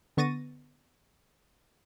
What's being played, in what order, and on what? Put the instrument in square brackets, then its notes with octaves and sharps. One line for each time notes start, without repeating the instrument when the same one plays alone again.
[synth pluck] D3 B3 C#6 A6 A#6 D#7